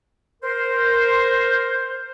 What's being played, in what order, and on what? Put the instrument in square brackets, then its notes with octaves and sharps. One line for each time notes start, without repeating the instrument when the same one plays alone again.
[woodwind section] A#4 C5